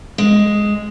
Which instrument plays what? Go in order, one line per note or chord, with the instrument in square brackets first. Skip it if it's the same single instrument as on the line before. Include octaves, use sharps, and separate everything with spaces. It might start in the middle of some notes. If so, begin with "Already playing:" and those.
[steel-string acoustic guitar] G#3